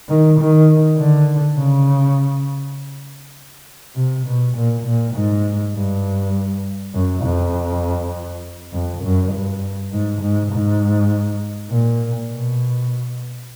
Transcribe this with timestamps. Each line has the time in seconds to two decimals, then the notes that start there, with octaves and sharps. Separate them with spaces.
0.08 D#3
0.39 D#3
0.97 D3
1.57 C#3
3.95 C3
4.26 B2
4.55 A#2
4.85 A#2
5.15 G#2
5.75 G2
6.93 F#2
7.23 F2
8.72 F2
9.02 F#2
9.32 G2
9.92 G#2
10.21 G#2
10.51 G#2
11.69 A#2
12.30 B2